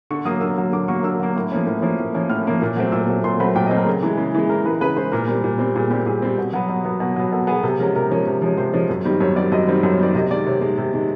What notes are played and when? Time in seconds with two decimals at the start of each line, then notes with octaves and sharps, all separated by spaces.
0.11 D3 C#6
0.25 F#3 A#3 D#6
0.41 D3 E6
0.58 F#3 A#3
0.72 D3 D6
0.88 F#3 A#3 C#6
1.04 D3 E6
1.20 F#3 A#3
1.36 A2
1.52 F3 A#3 C#4
1.66 A2
1.82 F3 A#3 C#4
1.99 A2
2.14 F3 A#3 C#4
2.30 A2 F6
2.45 F3 A#3 C#4
2.62 A#2
2.76 F#3 A3 C4
2.92 A#2 E6
3.08 F#3 A3 C4
3.24 A#2 C6
3.40 F#3 A3 C4 B5
3.55 A#2 G5
3.66 D#5
3.71 F#3 A3 C4
3.77 A#4
3.86 C#3
4.02 E3 G#3
4.18 C#3
4.34 E3 G#3
4.49 C#3 A#4
4.65 E3 G#3 B4
4.81 C#3 B4
4.96 E3 G#3 C5
5.12 A#2 A#4
5.27 G3 C4
5.44 A#2
5.59 G3 C4
5.75 A#2 G#4
5.90 G3 C4 G4
6.06 A#2 G#4
6.22 G3 C4
6.38 B2
6.53 F#3 B3
6.69 B2
6.84 F#3 B3
7.00 B2
7.16 F#3 B3
7.32 B2 A4
7.47 B3 G#4
7.52 F#3
7.63 C3 A4
7.79 F3 G#3 C#4 A#4
7.95 C3 A#4
8.10 F3 G#3 C#4
8.27 C3
8.42 F3 G#3 C#4
8.57 C3 C5
8.73 F3 G#3 C#4
8.90 F#2
9.04 D#3 G3 C4
9.20 F#2 C#5
9.36 D#3 G3 C4 D5
9.52 F#2 D#5
9.67 D#3 G3 C4
9.83 F#2
9.91 C#5
9.99 D#3 G3 C4 D5
10.14 C3 D#5
10.30 G#3 D5
10.34 D#3
10.46 C3 C#5
10.61 D#3 G#3
10.78 C3
10.94 D#3 G#3